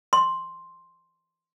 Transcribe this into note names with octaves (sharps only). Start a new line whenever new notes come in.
C6